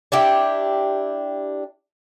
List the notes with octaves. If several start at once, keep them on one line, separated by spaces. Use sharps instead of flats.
D4 E4 G4